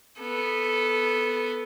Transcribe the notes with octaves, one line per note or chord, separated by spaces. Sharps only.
B3 A4